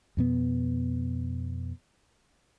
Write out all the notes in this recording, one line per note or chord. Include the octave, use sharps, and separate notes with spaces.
F2 B2 B3